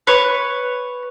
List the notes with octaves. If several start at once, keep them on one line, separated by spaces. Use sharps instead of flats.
B4 C#5